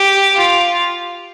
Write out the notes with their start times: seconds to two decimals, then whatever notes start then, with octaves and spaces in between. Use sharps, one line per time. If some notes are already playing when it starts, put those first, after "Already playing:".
Already playing: G4
0.36 F4